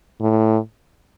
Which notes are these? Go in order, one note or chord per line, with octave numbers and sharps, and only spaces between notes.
A2